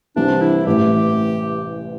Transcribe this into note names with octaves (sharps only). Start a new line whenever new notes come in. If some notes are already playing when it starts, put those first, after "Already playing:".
C2 C3 E3 D4
E4
A1 A2 E3 G4